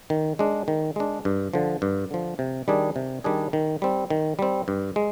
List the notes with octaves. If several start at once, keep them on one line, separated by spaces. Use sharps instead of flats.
D#3
G#3 D4
D#3
G#3 D4
G2
D3 F3
G2
D3 F3
C3
D#3 G3 D4 G#4
C3
D#3 G3 D4 G#4
D#3
G3 C4
D#3
G3 C4
G2
G#3